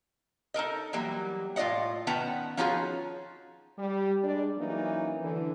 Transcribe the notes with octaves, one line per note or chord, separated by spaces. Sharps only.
D#4 A4 A#4 D#5
E3 F#3 G3 A#3
A2 F4 D5 D#5 F#5
D#3 B3 C#4 F#5 A5 A#5
F3 C#4 D#4 F4 F#4 G#4
G3
G#3 D4 D5
E3 F#3 A#3 C#4 D#4
D3 E3